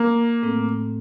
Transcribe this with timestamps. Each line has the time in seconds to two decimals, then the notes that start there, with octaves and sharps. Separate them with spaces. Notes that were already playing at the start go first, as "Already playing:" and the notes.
Already playing: A#3
0.43 A2 A3 C4